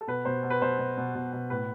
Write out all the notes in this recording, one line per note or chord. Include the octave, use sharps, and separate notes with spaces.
A4
B2 B4
B2 C5
B2
B4
B2 C5
B2
B2
B2
B2
A2 B4